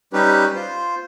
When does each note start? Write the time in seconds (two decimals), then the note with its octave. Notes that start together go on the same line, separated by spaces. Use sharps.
0.13 G3 C#4 D#4 G4 B4
0.55 F4 C5